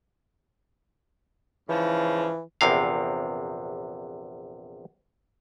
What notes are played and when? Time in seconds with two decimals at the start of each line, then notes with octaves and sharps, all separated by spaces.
1.69 G#2 C#3 E3 F3
2.61 A#1 E2 C3 F5